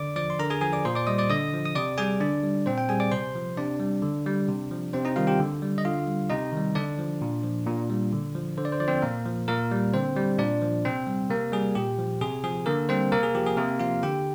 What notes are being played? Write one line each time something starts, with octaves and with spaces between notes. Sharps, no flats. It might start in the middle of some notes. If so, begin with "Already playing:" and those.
Already playing: D3 D5 D6
F3 D5 D6
C6
D3 A#4 A#5
G#4 G#5
F3 G#4 G#5
D5 D6
A#2 C5 C6
D5 D6
G3 D#5 D#6
D5 D6
D3 D#5 D#6
F3
D#6
C3 D5 D6
G3 G#4 G#5
D3 D4 D5
G3
A#2 C4 C5
G5
G3 G#4 G#5
D5 D6
C3 C5 C6
F3
C3 D4 D5
G3
D3
G3
C3
F3
C3 C4 C5
D#4 D#5
D#3 G3 F4 F5
G4 G5
D3
G3
D#5
D3 F4 F5
G3
C3 D#4 D#5
D#3 G3
D3 D4 D5
F3
A#2
F3
A#2
G3
D3
F3
D3 C5
D5
C5
F3 D5
C4 C5
A#2 A#3 A#4
F3
A#2 A#3 A#4
G3
D3 C4 C5
G3
A#2 D4 D5
F3
C3 C4 C5
G3
C3 A#3 A#4
G3 G#4
A#2 G4
F3
C3 G#4
F3 G#4
D3 A#3 A#4
G3 C4 C5
C3 A#3 A#4
G#4
F3 G4
G#4
C3 A#3 A#4
F3 F4 F5
D3 G4 G5